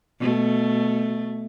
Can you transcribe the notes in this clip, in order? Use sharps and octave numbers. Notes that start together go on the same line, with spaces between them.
B2 A3